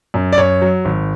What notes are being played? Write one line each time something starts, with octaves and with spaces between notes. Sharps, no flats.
F#2
D5
F#2 C#5
F#3
G#1